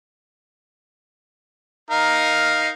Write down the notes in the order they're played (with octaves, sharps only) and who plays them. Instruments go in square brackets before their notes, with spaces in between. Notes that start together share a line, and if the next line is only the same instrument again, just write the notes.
[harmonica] D#4 A#4 F5